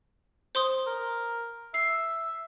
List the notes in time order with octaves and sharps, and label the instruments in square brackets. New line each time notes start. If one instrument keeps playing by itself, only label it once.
[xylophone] C5 C6 D#6
[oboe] A#4
[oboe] E5 [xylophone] C7